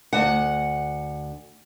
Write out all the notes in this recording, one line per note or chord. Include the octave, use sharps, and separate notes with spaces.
D2 F#5